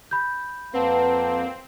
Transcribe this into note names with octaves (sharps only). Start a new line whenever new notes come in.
B5 G6
F2 A#3 C4 B4 F#5 A5